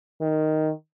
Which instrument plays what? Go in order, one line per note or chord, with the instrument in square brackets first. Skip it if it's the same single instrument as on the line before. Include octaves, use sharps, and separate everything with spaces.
[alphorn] D#3